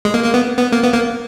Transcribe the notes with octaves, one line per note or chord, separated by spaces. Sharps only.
G#3
A#3
A#3
B3
B3
A#3
B3
A#3